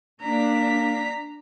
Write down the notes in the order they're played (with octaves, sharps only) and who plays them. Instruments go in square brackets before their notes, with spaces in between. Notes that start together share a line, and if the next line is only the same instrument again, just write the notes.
[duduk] A#3 [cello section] D4 [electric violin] A#5 B6